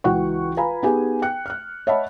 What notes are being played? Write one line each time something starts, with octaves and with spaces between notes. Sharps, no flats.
C#2 E3 F#4 F#5 G5 C#6
F4 B4 F5 G#5 A#5 B5
B3 D#4 G4 G#4 G#5
G5 F#6 C#7
F6 F#6
C#5 D#5 E5 F#5 A5 B5